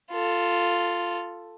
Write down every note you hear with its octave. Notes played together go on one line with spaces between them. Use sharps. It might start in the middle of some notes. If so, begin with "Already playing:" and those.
F4 A4